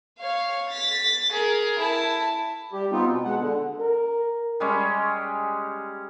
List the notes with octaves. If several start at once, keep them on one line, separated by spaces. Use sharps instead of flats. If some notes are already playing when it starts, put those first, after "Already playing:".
C#5 F5
A6 B6
G#4 A#4
E4 A5
G3 G4
B3 C4 D#4 F4
B2
B2 G#3 F#5
D3
A#4
G3 G#3 C#4